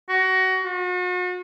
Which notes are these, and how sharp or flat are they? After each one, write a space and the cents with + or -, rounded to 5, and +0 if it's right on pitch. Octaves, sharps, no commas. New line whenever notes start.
F#4 +20
F#4 -40